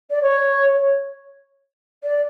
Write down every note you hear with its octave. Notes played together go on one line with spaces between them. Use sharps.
D5
C#5
D5